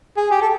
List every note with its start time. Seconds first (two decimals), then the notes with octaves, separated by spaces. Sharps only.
0.17 G#4
0.31 G4
0.42 A4